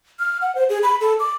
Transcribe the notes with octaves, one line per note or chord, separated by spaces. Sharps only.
F6
F#5
C5
G#4
B5
A4
D6